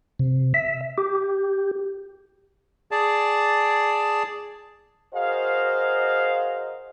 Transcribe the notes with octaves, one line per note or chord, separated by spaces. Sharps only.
C3
E5
G4
G#4 D5 A5
F#4 G#4 A#4 C5 D#5 F5